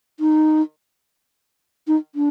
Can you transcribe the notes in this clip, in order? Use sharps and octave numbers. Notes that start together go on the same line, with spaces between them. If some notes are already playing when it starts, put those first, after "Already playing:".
D#4
D#4
D4